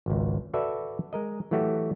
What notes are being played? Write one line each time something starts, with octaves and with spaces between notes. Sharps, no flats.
G#1 C#2
F#4 A4 B4 D5 E5
G#3 A#4 D#5
E3 F#3 A3 F#4 G4